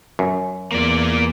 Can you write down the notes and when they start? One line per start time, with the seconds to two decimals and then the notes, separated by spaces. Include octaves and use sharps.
0.19 F#2
0.72 E2 A#3 D5